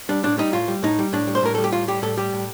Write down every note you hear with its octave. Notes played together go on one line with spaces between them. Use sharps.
G3 D4
A2 D4
G3 D#4
A2 F4
G3
A2 D#4
G3
A2 D4
G3
C5
A2 A#4
G3 A4
G4
A2 F4
G3 G4
A2 A4
G3 G4
A2